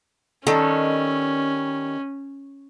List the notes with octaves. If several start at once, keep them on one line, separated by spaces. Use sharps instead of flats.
D#3 G3 C#4 A4